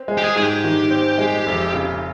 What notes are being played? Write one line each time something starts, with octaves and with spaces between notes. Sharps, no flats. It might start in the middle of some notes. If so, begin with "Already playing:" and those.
Already playing: C4
G#3
G4
G#4
G#2 G#4
G4
D#3
C4
G#3
F1
C#3